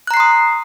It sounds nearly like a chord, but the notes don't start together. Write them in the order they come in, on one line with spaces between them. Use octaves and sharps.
F#6 A#5 C7 C6 D#6